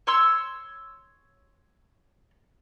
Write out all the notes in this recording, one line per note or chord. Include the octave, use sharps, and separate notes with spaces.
C#5 C6 E6